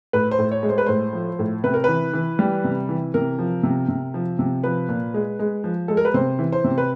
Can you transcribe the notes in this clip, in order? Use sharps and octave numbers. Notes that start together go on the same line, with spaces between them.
A2 B4
C5
A2
C#5
G#3
C5
B4
A2 C5
F3
A2
C3 B4
A#4
E3 B4
E3
G3
C3
E3
C3 A#4
F3
C3
C3
F3
C3
F3 B4
A#2
G#3
G#3
F3
G#3 A4
A#4
B4
C3 C5
E3
C5
C3
B4